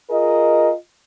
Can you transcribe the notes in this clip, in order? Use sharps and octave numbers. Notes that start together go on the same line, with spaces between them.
F4 G#4 A#4 D#5